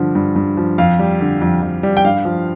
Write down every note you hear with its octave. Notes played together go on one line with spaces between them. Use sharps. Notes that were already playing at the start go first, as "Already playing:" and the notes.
Already playing: G2 D3 F3
G2
G2
F3
F2 F5
G3
D3
F2
F2
G3
G5
G2 F5
F3